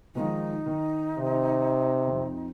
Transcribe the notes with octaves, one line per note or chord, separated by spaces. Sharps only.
D#3 F3 G#3 D#4
D#3
C3
F2